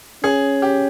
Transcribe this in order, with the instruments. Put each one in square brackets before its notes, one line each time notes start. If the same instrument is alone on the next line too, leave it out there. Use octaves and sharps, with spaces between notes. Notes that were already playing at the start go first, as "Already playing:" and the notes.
[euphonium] C#4 [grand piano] G#4
[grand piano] G4